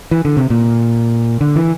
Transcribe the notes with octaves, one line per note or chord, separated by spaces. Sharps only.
E3
D3
C3
A#2
D3
E3